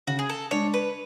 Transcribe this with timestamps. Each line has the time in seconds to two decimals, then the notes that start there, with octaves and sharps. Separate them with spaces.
0.07 C#3 F#4
0.19 G#4
0.29 A4
0.51 G#3 D4 C#5
0.74 B4